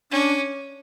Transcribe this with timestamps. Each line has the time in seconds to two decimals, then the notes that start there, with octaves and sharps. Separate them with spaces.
0.11 C#4 D4